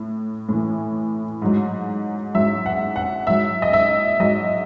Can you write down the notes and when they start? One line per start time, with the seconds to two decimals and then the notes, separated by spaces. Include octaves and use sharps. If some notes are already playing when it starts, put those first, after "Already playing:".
Already playing: A2
0.49 A2 E3
1.42 G#2 F#3
2.34 G#2 F#3 E5
2.66 F#5
2.96 F#5
3.27 G#2 F#3 E5
3.62 D#5
3.73 E5
4.20 G#2 F#3 D#5